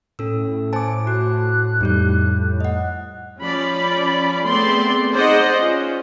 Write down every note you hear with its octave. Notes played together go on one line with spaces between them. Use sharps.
A2 C#4 A4 E6
C5 G#5 A5 D6
F#4 F#6
F2 G3 D#4 G6
D#5 F#5 F#6
F3 C#4 D5 B5
A3 B3 C4 G#4 D5 C6
D#4 G#4 C5 D5 D#5 F#5
C#4 F4